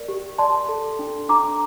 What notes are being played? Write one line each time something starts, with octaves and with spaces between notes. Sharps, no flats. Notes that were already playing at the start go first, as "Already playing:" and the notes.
Already playing: A#4 D5
G4
D5 A5 C6
A4
D4
D4 A#5 D6